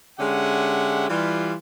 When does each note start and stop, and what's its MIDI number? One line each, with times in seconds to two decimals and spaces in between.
0.19 1.08 50
0.19 1.08 56
0.19 1.08 61
0.19 1.08 67
0.19 1.08 76
0.19 1.08 78
1.09 1.54 52
1.09 1.54 55
1.09 1.54 65